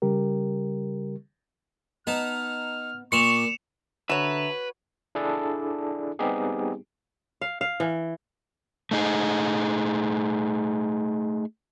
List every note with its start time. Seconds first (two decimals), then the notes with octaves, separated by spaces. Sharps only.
0.02 C#3 G3 G4 A#4
2.07 B3 D#4 A5 A#5 F6
3.12 A#2 A#3 D5 C6 C#6 C#7 E7 F7
4.10 D3 F#4 B4 C#5 E5 A5 A#5
5.15 D4 E4 G#4 A4 D5
6.19 G3 B3 C4 D#4 G4 G#4
7.41 F5
7.61 F5
7.80 E3
8.91 A3 D#4 G#4